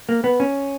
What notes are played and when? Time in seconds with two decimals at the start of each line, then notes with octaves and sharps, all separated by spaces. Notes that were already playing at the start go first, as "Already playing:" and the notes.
0.09 A#3
0.24 B3
0.40 C#4